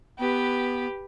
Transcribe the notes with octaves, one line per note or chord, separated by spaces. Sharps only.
B3 G4 B4